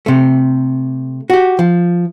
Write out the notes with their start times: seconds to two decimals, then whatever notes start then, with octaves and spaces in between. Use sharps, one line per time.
0.06 C3 A3
1.30 F#4 G4
1.59 F3